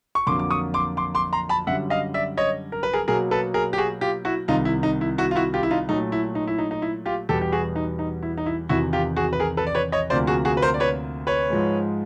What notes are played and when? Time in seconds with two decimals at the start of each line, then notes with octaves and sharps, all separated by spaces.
0.15 C#6
0.27 F2 D3 F#3 A#3 C6 D6
0.39 D6
0.51 C#6 D#6
0.74 C6 D6
0.97 C6 D6
1.15 C6 D6
1.32 A#5 C6
1.49 A5 B5
1.67 F#2 D3 G3 E5 F#5
1.90 D#5 F5
2.14 D5 E5
2.37 C#5 D#5
2.72 A#4
2.83 B4
2.93 G#4 A#4
3.08 B2 F#3 A#3 G#4 A#4
3.31 A4 B4
3.54 G#4 A#4
3.73 G4
3.78 F#4 G#4
4.01 F4 G4
4.25 E4 F#4
4.48 C2 C3 D#3 D#4 F4
4.65 E4
4.83 D#4
5.01 E4
5.18 E4 F#4
5.31 F4
5.36 E4 F#4
5.54 F4 G4
5.63 E4
5.71 D#4 F4
5.89 A#2 F#3 A3 D#4
6.12 E4
6.35 D#4
6.47 E4
6.58 D#4
6.71 D#4
6.82 E4
7.06 F4 G4
7.29 E2 B2 G3 B3 G4 A4
7.41 G4
7.52 F#4 G#4
7.76 D#4
7.99 D#4
8.23 E4
8.38 D#4
8.46 E4
8.69 E2 C3 D#3 E4 F#4
8.93 F4 G4
9.16 F#4 G#4
9.33 B4
9.40 G#4 A#4
9.57 A4 B4
9.67 D5
9.75 B4 C#5
9.92 C#5 D#5
10.10 D2 C3 F3 A#3 C5 D5
10.27 F#4 G#4
10.45 F#4 G#4
10.57 B4
10.62 A#4 C5
10.74 D5
10.80 B4 C#5
11.27 B4 C#5
11.50 G#2 F3 G#3